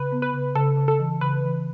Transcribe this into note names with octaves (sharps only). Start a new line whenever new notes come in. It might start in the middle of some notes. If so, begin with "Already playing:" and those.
Already playing: C#3 B4
B3
B4
C#3
C#3 A4
C#3
A4
E3
C#3 B4
E3